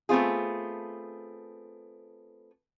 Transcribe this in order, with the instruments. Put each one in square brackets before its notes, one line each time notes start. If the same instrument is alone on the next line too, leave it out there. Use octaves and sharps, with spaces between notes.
[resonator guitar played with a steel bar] A3 B3 C4 F4 G#4